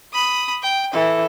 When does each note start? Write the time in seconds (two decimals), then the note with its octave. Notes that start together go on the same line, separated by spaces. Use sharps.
0.13 B5 D#6
0.62 G5
0.93 E3 A4